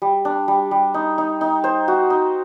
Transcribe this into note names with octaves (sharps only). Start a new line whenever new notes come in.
G3
D4
G3
G3
D#4
D#4
D#4
C5
F#4
D#4